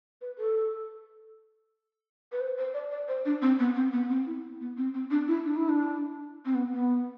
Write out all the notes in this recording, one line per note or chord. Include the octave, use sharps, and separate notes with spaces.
B4
A4
B4
C5
C5
D5
D5
C5
D4
C4
B3
C4
B3
C4
E4
B3
C4
C4
D4
E4
D4
E4
D4
C4
B3
B3